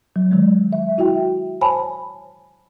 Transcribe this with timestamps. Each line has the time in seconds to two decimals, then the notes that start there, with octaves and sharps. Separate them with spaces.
0.16 F#3
0.31 D#3 F#3 G#3
0.73 E5
0.98 E4 F#4 E5 G5
1.61 C5 C#5 G#5 A5 B5